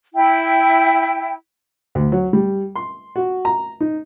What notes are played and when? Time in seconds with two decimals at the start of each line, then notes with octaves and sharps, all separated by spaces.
0.14 E4 G5
1.95 D2
2.12 F#3
2.33 G3
2.75 C6
3.16 F#4
3.45 A#5
3.80 D#4